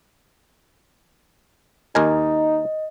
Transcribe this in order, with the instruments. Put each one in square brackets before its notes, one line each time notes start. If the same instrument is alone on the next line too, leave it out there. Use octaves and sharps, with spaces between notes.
[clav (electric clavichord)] D#2 A#4 G#5 [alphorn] D#4 [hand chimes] D#5